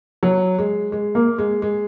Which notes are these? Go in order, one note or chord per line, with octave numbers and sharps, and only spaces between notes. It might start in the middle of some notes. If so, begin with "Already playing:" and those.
F#3
G#3
G#3
A#3
G#3
G#3